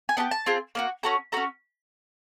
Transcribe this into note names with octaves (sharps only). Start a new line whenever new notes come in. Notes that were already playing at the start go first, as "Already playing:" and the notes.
G#5
B3 D4 G4 A5
A5
C4 F4 G#4
A#3 D#4 F#4
C#4 F#4 A4 A#5
C#4 F#4 A4 A#5